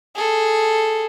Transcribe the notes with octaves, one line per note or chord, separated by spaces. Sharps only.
G#4 A4